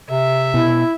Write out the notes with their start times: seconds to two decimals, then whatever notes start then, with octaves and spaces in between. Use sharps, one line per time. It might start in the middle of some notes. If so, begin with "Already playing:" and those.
0.11 C3 E5
0.54 B2 E4